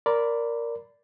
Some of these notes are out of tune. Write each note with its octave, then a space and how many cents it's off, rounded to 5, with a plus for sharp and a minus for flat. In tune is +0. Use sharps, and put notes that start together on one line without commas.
A#4 +0 D5 -10 B5 +25